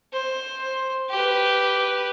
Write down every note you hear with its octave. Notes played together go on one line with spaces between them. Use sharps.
C5
G4 B4